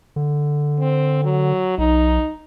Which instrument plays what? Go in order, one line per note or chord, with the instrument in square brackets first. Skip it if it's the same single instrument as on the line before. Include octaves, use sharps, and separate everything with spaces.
[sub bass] D3
[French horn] C4
F#3
[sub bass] B1 [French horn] D#4